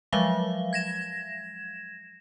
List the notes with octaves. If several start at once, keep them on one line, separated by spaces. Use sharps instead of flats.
F3 F#3 G#3 E5 F5
G#6 A#6 E7